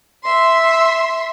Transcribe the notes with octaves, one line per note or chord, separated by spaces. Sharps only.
E5 C6